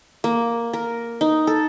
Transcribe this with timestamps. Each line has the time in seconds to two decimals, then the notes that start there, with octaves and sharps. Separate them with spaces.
0.24 A#3
0.73 A#4
1.21 D#4
1.47 A4